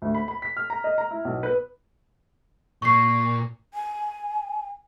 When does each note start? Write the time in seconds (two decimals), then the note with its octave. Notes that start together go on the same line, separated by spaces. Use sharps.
0.02 D2
0.14 B5
0.28 B5
0.42 B6
0.57 F6
0.70 A#5
0.84 D#5
0.98 A#5
1.11 E4
1.25 B1
1.43 B4
2.82 A#2 C#6 C7
3.74 G#5